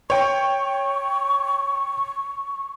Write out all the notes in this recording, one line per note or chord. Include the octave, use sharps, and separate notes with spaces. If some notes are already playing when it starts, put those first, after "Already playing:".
C#5 G5 C#6